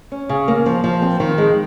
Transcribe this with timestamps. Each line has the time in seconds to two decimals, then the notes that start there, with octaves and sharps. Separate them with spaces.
0.12 C#4
0.29 C#3
0.48 A#3
0.66 F3
0.84 F3
1.02 C4
1.20 D#3
1.38 G#3